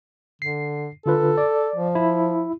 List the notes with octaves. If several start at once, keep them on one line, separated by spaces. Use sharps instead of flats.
D3 C7
D3 F4 A4 B4
D5
F3
E4